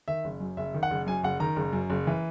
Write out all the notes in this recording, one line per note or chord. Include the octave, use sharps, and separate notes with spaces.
D#3 E5
F#1
F#2
F#1 E5
D#3
F#5
F#1
F#2 G#5
F#1 F#5
D#3 A#5
F#1
F#2
F#1
E3